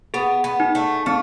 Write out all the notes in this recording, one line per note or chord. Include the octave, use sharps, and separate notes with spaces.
B3 G#4
B3
D#4
A3
A3 C4